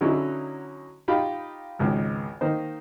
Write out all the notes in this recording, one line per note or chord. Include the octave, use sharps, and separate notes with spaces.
D3 F#3 C#4 D#4 E4
D#4 F4 G4 B5
G#1 C#2
D#3 A#3 D#4 C5